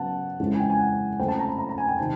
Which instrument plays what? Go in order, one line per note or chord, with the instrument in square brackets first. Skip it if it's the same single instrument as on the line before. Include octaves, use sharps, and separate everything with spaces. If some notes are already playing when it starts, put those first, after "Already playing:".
Already playing: [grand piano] C#3 F#3 B3 F#5 A5
F2 C#3 E3 G#3
G#5
G5
G#5
F#5
C#3 F3 A3 C4 G5
A5
A#5
B5
A#5
A#5
G#5
G5
C3 D#3 A5